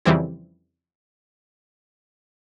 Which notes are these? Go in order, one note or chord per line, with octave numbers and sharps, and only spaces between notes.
F2 C#3 E3 G3 C4 E4